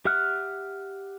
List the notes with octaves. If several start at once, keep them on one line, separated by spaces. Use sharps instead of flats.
G4 E5 F#5 F6 F#6